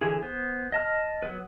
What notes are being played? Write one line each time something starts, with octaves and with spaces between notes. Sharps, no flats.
D3 E3 G#4
B3 C5
D#5 A5 F6
F#3 B3 B4